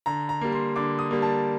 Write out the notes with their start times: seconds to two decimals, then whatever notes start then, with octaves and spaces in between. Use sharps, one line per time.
0.06 D3 A#5
0.29 A#5
0.41 G3 A#3
0.52 C6
0.76 D3 D6
0.99 D#6
1.11 G3 A#3
1.22 A5